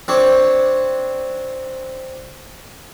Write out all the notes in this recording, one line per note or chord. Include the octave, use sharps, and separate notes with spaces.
C4 D4 C#5